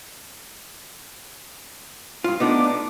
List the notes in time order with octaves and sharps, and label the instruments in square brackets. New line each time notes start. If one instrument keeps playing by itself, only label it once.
[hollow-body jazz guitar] G2 F4
[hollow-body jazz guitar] A3 B3 D#4 [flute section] D4 D6